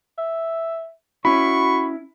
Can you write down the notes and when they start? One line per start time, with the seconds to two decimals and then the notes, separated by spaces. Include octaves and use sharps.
0.18 E5
1.25 C#4 E4 F#4 B5 C#6